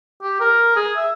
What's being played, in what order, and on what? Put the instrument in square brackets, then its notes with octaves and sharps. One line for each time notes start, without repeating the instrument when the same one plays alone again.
[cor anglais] G4
A#4
G#4
E5